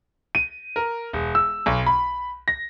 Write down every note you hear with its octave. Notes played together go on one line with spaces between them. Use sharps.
D#7
A#4
E1
E6
B1
B5
A#6